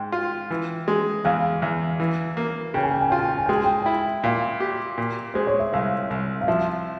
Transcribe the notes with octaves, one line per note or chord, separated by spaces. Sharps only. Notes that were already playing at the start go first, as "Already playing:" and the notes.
Already playing: G#2 G5
F4
E3
G#3
E2 F5
E2
E3
A#3
C#3 G5
G#5
G5
G#5
F4 G5
G#5
G5
G#5
G#3 G5
G#5
G5
G#5
E4 G5
A#2 F5
G4
A#2
G#3 C5
C#5
E5
C2 F5
C2
F5
F3 E5